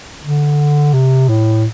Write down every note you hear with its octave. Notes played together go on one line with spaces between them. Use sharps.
D3
C3
A2